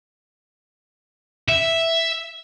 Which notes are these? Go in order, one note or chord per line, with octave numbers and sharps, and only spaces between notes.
E5